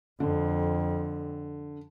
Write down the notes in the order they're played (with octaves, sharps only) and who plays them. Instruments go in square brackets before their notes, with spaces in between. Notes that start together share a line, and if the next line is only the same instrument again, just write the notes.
[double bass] F2 [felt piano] D3